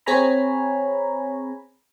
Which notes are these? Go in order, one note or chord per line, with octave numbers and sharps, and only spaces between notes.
C4 G#4 C#5 G#5 A#5 B5